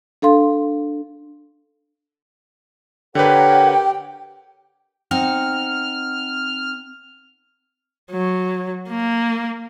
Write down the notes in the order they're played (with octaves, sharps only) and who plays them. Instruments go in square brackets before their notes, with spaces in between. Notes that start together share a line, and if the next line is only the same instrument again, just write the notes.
[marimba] D4 A4 F5 C6
[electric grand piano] D3 B4 [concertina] G4 [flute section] A#4 C#5 F#5 [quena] G5
[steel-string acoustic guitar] C4 D#4 F#5 [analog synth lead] F6
[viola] F#3
A#3